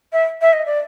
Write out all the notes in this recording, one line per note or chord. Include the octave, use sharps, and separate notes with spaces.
E5
E5
D#5
D5